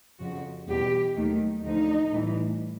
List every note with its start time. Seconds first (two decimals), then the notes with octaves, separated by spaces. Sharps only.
0.19 F2 C#3 F3 F#4
0.68 E2 B2 G3 G4
1.16 D#2 D#3 F#3 A3
1.64 D2 D3 F3 D#4
2.12 A2 E3 G3